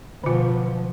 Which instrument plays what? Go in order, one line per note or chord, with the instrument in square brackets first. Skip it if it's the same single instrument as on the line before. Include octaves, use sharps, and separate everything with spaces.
[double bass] B2 F3 [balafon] D3 F4